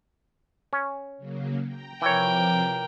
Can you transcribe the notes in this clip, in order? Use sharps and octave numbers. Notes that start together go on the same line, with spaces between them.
C#4
C#3 F#3 A#3
G5 A#5
C3 E3 F3 A#4 C#5 G5 D6